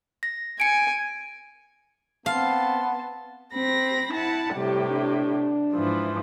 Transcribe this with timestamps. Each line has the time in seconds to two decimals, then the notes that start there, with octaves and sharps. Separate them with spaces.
0.23 A#6
0.60 G#5 C#7 D7
2.26 B3 C4 F5 A5 C6
3.54 C4 B5 A#6
4.13 E4 F#5 A5
4.54 A2 C3 G3 G4
4.90 D4
5.74 G#2 E3 F3